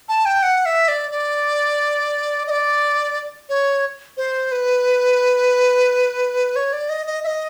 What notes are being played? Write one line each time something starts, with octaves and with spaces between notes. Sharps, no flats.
A5
G5
F#5
E5
D5
D5
D#5
D5
C#5
C5
B4
C#5
D5
D#5
D#5
E5
D#5